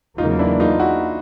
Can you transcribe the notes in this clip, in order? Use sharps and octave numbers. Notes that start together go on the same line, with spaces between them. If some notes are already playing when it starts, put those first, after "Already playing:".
E2 C#3 F#3 A#3 D#4 F4
D4 E4
D#4 F4
E4 F#4